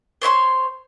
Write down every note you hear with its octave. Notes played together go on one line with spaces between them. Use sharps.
C5 C#5 E5 C6